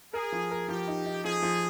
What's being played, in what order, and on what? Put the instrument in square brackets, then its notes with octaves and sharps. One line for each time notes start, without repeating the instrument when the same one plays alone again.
[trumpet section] G#4 [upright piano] A#4
[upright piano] F3
A#4
[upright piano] F3 [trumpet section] G4
[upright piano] D#4
D#4
[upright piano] F3 [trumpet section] G#4
[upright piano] F3